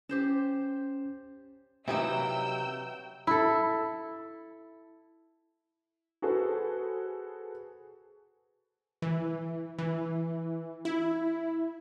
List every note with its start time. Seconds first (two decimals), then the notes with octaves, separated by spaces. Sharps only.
0.09 C#4 G4 C5 A5
1.88 C3 E3 F#3 A#3 D#4 G5 E6 G6
3.27 E4 A4
6.22 F#4 G#4 A4 B4 C5
9.02 E3
9.78 E3
10.85 E4